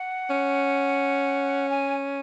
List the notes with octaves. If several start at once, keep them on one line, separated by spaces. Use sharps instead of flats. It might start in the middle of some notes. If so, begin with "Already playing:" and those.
Already playing: F#5
C#4
G#5